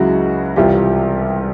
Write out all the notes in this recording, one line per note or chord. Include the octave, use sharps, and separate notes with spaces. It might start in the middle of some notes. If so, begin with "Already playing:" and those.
Already playing: C#2 C#3 F#3 E4 F#4
C2 C3 E3 G3 F4 G4